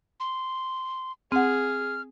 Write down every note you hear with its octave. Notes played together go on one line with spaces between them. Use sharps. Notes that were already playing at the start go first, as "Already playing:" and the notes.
C6
C4 G#4 F#5 F6